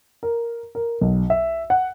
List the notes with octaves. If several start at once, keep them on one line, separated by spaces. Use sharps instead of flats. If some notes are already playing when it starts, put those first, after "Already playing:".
A#4
A#4
B1
E5
F#5